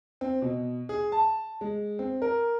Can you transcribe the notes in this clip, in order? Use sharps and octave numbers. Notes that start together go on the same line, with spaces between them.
C4
B2
G#4
A5
G#3
C4
A#4